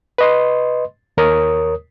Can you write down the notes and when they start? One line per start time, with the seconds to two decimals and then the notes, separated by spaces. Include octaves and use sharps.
0.18 B4 D#5 C6
1.17 D#2 A#4 C#5 D#6